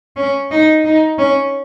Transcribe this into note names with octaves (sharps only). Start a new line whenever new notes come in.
C#4
D#4
D#4
C#4